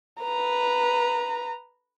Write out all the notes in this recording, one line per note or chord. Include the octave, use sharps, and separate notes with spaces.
B4 A#5